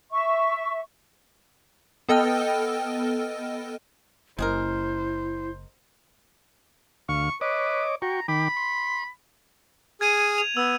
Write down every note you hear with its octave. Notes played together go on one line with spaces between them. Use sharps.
E5 C#6
B3 A4 D#5 G5 E6 F6
F#1 G#3 E4 G#4 A#4 C5
D2 F5 C#6
B4 C#5 D#5 D6
F#4 G5 A#5 C#6
D#3 G5 B5 D6
C6
G#4 D#6 F6 G#6 D#7
F7
B3 E6